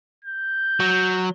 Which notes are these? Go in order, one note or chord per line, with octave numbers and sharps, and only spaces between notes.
G6
F#3